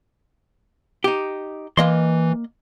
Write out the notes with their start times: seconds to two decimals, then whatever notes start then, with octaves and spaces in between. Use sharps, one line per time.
1.04 D#4 G4
1.77 E3 A#3 D#5 C6